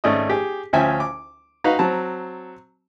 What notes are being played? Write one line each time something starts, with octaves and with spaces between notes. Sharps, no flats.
G#1 A3 C#4 D5 D#5 D#6
G4 G#4
D2 F3 C#4 E5 G5 G#5
D6
D#4 F#4 B4 F5
F#3 C4 A5 A#5